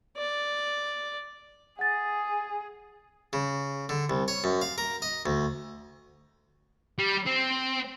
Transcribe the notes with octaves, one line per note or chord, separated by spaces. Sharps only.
D5
G#4 F#5 A6
C#3
D3
C2
C#5
F#2
F5
A#4
D#5
D2
G3
C4